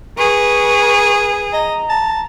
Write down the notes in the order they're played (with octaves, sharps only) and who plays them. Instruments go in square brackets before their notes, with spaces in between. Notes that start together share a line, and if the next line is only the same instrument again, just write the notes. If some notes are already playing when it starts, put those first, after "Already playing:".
[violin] G#4 [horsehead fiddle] B4 [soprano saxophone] C#6
[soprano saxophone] D#5 [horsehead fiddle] A#5
[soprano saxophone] A5